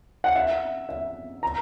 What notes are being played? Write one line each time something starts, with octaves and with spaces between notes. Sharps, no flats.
F#5
E5
E5
A#5